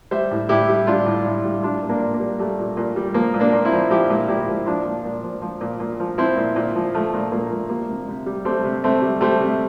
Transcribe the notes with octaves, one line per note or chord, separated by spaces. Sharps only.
G3 C5 E5
A2
A2 E4 G4
G3
G3 D4 F4
A2
A2
G3
G3 D4 F4
A#2
A#3 D4
A#2
A#3
G3
G3 A3
A#2
A#2
G3
F3 A#3
A#2
A#3 D4
A#2
C4 E4
F3
F3 E4 G4
A#2
A#2 E4 G4
F3
F3 D4 F4
A#2
A#2
F3
F3
A#2
A#2
F3
F3 C4 E4
A#2
A#2
F3
F3 A3
A#2
A#2 A#3
F3
G3 A#3
C3
C3
G3
G3 A3 C4
C3
C3 A3 C4
G3
G3 A3 C4
C3